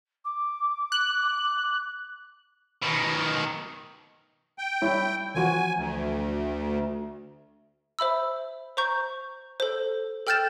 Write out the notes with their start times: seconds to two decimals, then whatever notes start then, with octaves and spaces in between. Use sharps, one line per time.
0.25 D6
0.92 F#6
2.82 B2 D#3
4.58 G5
4.82 G3 E4 C#5
5.35 E3 F3 F#4 G#5
5.77 D2
7.99 C5 E5 B5 E6
8.77 C5 A#5 C#6 G6
9.60 A4 C5
10.27 A4 G5 F6 G6 A6 E7